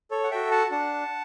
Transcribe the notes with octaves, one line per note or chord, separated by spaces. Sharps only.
A4 C#5
F#5
F#4 A4 E5 G5
F#5 A5
D4 F#5 A5